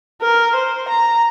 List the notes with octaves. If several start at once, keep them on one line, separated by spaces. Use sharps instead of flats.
A#4
C5
A#5